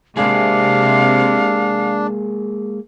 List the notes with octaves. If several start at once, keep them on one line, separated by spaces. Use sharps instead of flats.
C3 G#3 A#3 D4 G#4 F5